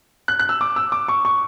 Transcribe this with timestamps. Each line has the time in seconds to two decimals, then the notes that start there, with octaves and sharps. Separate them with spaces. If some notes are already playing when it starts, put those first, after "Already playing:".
0.28 F#6
0.39 F#6
0.49 E6
0.61 D6
0.76 E6
0.92 D6
1.08 C#6
1.25 C#6